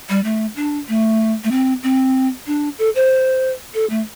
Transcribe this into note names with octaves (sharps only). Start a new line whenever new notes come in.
G3
A3
D4
A3
A3
C4
C4
D4
A4
C5
A4
A3